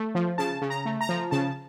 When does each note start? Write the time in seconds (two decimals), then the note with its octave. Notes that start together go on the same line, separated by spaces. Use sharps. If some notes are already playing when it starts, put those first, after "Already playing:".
Already playing: A3
0.15 F3
0.38 C#3 A5
0.62 C#3
0.70 A#5
0.86 A3
1.01 A#5
1.09 F3
1.31 C#3 A5